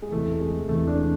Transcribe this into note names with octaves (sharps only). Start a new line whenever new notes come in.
G#3
E2 C3 E3 A3
G#3
E2 C3 E3 A3
D4